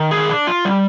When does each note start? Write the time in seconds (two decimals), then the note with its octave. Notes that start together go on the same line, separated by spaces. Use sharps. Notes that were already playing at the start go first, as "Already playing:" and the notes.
Already playing: D#3
0.11 G#4
0.29 D4
0.47 F4
0.65 G3